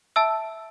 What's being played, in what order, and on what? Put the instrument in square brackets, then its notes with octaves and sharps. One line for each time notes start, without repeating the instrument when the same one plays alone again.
[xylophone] E5 A5 E6